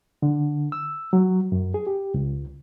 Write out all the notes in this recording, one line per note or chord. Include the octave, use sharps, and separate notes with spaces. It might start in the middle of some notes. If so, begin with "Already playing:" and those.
D3
E6
F#3
F#2
G#4
G4
C#2